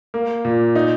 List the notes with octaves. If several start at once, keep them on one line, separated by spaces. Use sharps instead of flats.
A#3
A#2
D#4